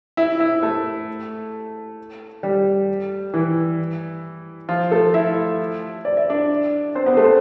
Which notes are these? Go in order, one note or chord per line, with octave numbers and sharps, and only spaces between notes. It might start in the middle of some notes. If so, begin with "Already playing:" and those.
E4 E5
E4 E5
A3 A4
G3 G4
E3 E4
F3 F4
A3 A4
E4 E5
D5
E5
D4 D5
C4 C5
B3 B4
A3 A4
C5